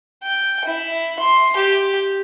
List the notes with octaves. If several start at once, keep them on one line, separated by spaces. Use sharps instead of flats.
G5
E4
C6
G4